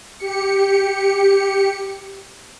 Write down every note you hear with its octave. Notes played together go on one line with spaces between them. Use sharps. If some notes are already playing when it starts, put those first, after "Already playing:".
G4 C#7